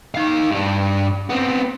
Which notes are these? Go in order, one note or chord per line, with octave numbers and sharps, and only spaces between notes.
D#4 F5
G2 D4
B3 C4